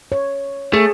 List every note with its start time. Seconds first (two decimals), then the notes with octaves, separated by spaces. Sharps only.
0.12 C#5
0.73 A3 G#4